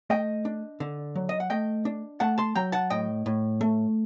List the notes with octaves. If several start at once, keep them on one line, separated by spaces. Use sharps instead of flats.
A3 D#5 G5
D4
D3
F#3
D#5
F#5
A3 D#5 G5
D4
A3 F#5 A5
A5 C6
F#3 G5 A#5
F#5 A5
A2 D#5 G5
A2
A3